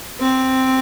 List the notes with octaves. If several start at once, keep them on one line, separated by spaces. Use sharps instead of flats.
C4